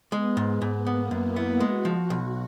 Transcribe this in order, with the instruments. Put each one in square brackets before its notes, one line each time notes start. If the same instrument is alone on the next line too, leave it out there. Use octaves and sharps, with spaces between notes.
[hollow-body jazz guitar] G#3 [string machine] B3
[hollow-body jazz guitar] G#2
G#2
[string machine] A#3 [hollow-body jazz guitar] B3
[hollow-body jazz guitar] F#2
[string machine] E4
[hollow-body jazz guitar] B3
[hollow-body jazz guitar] G#3 [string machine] F#4
[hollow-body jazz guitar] F3
B1